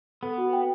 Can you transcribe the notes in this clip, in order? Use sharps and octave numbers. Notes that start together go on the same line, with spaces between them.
B3 A4
F#4
G5